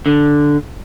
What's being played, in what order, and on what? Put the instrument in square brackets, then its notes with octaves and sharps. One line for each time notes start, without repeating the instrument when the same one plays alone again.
[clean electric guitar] D3